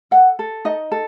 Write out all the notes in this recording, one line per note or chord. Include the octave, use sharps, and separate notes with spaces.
A4 F#5
A4
D#4 D#5
A4